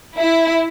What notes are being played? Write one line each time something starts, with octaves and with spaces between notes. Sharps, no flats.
E4